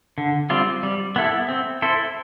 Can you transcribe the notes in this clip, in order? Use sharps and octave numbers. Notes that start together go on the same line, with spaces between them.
D3
G3 C4 F4
G3
B3 E4 A4
C4
E4 A4 C5